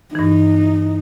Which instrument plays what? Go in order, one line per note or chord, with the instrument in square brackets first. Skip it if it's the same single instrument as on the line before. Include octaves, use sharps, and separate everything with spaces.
[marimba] G2 E3 [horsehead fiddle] D#4